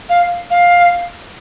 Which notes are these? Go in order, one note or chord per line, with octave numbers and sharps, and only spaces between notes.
F5
F5